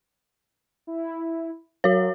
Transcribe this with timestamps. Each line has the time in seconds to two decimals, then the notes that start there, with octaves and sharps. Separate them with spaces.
0.87 E4
1.84 F#3 F#4 C#5